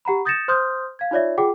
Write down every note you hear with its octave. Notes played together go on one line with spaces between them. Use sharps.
G4 F#5 A#5 B5
D#6 G6 A6 A#6 C#7 E7
C5 C6 D#6 F6 G6
F5 G#6
D#4 F4 C#5 D5 E5
F4 G#4 F#5 G5 D6